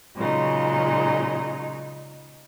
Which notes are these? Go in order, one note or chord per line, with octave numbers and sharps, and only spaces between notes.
A#2 C#3 F#3 G#3 D#4